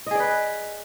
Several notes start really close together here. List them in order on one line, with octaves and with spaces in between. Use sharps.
D#5 G#4 D5 B4